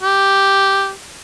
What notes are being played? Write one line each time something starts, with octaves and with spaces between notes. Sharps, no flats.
G4